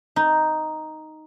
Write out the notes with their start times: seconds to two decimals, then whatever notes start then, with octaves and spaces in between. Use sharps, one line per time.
0.16 D#4